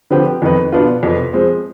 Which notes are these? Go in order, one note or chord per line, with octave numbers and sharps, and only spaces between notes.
D3 F3 C4 G4 B4
F2 D#3 B3 D#4 B4
B2 B3 D4 F4 B4
F2 C3 F3 B3
F3 G#3 C4